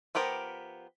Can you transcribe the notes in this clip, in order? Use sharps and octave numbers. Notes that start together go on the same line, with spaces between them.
F3 B3 G4 A#4